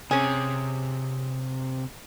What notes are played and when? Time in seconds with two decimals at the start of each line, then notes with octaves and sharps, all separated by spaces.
0.11 C3 C#4 G#4